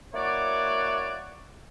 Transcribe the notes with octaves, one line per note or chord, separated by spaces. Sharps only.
A#3 E4 F#4 C#5 D5